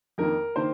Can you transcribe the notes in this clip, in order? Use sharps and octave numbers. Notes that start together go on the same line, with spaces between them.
F2 D#3 A#3 A#4
D#3 A#3 C5